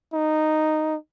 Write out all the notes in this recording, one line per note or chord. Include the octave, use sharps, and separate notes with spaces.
D#4